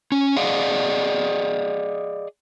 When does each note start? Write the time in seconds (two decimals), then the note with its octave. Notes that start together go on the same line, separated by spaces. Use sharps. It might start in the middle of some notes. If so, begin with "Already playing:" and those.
0.12 C#4
0.37 G#4 D5 D#5 F5 F#5